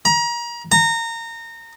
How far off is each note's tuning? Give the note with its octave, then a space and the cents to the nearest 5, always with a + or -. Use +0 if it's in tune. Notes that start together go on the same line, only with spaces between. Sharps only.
A#5 +30
A#5 -25